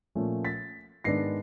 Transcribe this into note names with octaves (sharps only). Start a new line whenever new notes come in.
A#2 F3 A3 C#4
A6 B6
G#2 D#3 G#3 B3 D4 A#6 C7